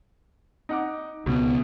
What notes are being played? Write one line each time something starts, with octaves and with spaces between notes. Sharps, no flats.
D#4 F#5 D6
C#2 B2 B3